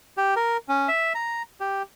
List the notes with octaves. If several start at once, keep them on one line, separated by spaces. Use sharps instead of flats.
G4
A#4
C#4
E5
A#5
G4